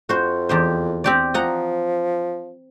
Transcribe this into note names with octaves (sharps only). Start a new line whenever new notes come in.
F2 F#4 C5
E2 G4 C5
C4 G4 D5
F3 D#5 F#5 A#5